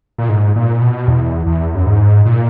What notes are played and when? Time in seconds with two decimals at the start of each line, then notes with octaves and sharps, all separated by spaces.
0.18 A#2
0.29 G#2
0.56 A#2
0.81 B2
1.08 E2
1.47 E2
1.75 F#2
1.86 G#2
2.25 A#2